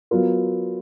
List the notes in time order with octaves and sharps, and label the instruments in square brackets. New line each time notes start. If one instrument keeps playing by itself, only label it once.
[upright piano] F#3 B3 F4 A#4